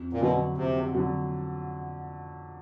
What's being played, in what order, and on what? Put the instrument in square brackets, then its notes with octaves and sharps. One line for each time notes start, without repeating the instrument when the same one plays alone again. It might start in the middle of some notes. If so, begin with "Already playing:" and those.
Already playing: [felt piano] F2
[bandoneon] A#2
[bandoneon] B2 [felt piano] D3 F#3
[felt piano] F2 [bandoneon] C3
[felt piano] D3 F#3